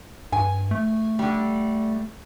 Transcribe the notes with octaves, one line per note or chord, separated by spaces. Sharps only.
G2 G#5
A3
D3 G3